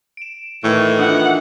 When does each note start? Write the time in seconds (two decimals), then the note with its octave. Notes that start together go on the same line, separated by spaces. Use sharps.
0.17 D7 E7
0.64 A2 D#3 E3 C#6
0.99 D4 F4 F#5